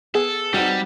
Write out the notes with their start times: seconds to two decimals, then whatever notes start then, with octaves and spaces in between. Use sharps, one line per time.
0.15 B3 G#4 A4
0.54 G3 C4 D#4 F#4